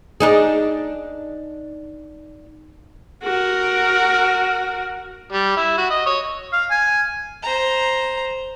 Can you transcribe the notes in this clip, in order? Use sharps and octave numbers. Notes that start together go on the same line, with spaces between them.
D4 D#4 G#4
F#4 A#4
G3
E4
F#4
D#5
C#5
F5
G#5
C5 A#5